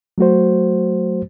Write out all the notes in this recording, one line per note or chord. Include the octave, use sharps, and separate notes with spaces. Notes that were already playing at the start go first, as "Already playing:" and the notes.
F#3 A3 F#4 C5